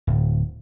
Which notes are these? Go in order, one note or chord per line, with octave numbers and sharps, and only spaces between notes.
D1